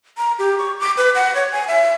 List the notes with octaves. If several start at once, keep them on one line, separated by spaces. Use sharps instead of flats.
A#5
G4
C#6
D6
B4
F#5
C#5
G#5
E5